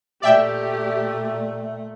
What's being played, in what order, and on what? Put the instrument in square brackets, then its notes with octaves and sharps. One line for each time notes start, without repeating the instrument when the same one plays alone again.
[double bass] A#2 A3 [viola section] G4 [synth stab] D5 E5 G5